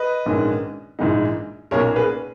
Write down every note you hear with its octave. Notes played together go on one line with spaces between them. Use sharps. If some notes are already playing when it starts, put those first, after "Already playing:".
Already playing: B4 D#5
A#1 G#2 D#3 G#3 C#4
A#1 G#2 E3 G#3 D#4
B1 A#2 A#3 C#4 A#4 C#5
G#4 B4